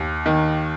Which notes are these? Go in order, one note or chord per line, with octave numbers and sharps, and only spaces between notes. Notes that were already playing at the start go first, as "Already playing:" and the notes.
Already playing: D#2
D#3